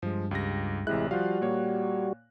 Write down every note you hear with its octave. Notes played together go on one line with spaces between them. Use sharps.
G2 F3 G#3
C#2 G4 A#6
A1 C3 G#3 E4 F#6
F3 G3 F4 F#4 F5
A#2 A#3 C#5